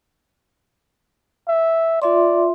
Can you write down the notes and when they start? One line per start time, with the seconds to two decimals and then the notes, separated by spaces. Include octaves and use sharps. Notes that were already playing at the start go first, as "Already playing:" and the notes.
1.48 E5
2.02 F4 D5 E5 C6